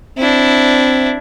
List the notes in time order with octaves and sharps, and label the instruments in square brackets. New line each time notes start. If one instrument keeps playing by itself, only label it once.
[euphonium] C4 [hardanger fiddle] D4 E4